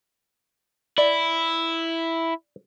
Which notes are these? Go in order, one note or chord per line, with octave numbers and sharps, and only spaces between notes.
E4 D5